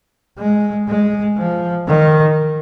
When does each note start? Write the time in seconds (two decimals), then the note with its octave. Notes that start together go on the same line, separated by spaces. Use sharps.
0.38 G#3
0.88 G#3
1.37 F3
1.88 D#3